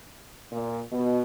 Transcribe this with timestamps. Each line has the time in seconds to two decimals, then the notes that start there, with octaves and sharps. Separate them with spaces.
0.51 A#2
0.92 B2